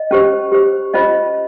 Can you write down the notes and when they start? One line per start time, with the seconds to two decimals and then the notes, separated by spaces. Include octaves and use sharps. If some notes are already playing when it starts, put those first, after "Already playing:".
Already playing: D#5
0.11 C#4 G4 C5
0.52 G4 C5
0.94 C#4 F4 C5 D#5